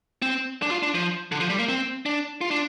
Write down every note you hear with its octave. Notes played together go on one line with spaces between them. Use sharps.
C4
D4
F4
D4
F3
D3
F3
G3
A#3
C4
D4
F4
D4